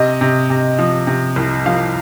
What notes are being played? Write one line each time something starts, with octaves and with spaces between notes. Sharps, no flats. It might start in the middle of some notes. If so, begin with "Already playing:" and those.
Already playing: C3 D#5
C3
C3
F3
C3
C2
F3 F5